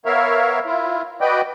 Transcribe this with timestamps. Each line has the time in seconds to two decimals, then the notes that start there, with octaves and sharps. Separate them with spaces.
0.06 B3 A#4 C#5 E5 F5
0.66 E4 F4
1.21 F#4 B4 D5 D#5 G5